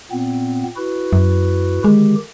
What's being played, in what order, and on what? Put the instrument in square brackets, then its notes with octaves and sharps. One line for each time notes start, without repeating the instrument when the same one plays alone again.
[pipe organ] A#2 B3 C4
E4 F#4 B4
[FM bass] F#2
[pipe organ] D3 D#3 G4 [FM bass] G#3